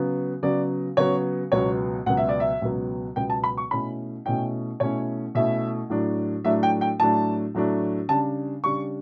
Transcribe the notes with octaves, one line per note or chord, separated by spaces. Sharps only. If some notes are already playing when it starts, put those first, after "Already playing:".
Already playing: C#3 F#3 B3
C#3 F#3 B3 D5
C#3 F#3 B3 C#5
C#2 B2 F#3 B3 C#5
C#2 B2 F#3 B3 F#5
E5
D5
E5
C#2 B2 F#3 B3
C#2 B2 F#3 B3 G5
A5
B5
C#6
B2 A3 C#4 E4 B5
B2 A3 C#4 E4 G5
B2 A3 C#4 E4 C#5
B2 A3 C#4 E4 E5
A2 F#3 A3 D4
A2 F#3 A3 D4 E5
G5
G5
A2 F#3 A3 D4 A5
A2 F#3 A3 D4
C#3 G3 D4 A5
C#3 G3 D4 C#6